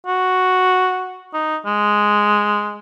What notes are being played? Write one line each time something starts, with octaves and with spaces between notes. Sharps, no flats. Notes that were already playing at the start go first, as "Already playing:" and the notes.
F#4
D#4
G#3